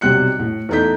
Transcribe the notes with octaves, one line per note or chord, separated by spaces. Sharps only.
B1 C3 G3 F#6 C#7
A2
E2 A3 D#4 A4 G6 B6